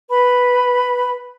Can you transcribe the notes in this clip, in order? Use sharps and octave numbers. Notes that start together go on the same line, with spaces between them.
B4 B5